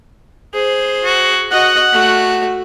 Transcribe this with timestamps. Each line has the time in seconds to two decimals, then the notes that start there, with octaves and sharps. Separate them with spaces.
0.54 G#4 C5
1.04 F#4
1.51 F#4 D#5 F#5
1.93 A3 F#4